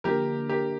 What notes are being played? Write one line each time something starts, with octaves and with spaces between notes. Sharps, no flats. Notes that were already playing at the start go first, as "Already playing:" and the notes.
D3 F3 A#3 D4 F4 G4 A#4
G4 A#4